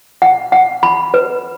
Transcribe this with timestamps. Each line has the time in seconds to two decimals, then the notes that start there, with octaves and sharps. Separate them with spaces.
0.22 F#5
0.52 F#5
0.83 B5
1.14 B4